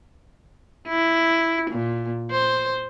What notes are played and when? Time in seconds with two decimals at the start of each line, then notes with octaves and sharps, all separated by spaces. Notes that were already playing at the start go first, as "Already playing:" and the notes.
0.88 E4
1.70 A#2
2.31 C5